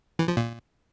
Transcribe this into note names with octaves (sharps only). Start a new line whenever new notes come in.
E3
F3
A#2